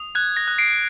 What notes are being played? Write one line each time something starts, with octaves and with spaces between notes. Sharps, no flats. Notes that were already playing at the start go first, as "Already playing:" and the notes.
Already playing: D#6
F#6 G#6
A#6
F#6
C7 D7
D7